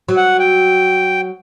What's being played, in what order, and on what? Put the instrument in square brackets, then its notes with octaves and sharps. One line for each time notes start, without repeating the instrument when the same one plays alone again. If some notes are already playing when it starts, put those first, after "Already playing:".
[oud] F#3
[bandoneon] F#5
G5